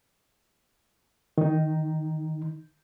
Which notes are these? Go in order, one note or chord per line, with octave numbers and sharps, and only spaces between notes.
D#3 D#4